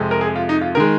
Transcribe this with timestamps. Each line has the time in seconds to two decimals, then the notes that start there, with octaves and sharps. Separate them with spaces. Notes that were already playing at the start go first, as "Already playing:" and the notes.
Already playing: F2 C3 G#3
0.11 A#4
0.21 G#4
0.36 F4
0.49 D#4
0.61 F4
0.75 D#3 G#3 A#4